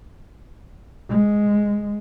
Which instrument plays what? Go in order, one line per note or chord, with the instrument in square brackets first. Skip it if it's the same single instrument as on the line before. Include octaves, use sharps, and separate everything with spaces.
[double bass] G#3